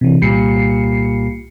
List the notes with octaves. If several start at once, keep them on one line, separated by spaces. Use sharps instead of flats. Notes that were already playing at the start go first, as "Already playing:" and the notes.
C3 E3
C2 A#2 G3 C7 C#7